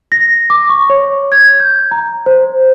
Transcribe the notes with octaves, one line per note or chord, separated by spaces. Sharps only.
A#6
D6
C#6
C#5
G#6
G6
A#5
C5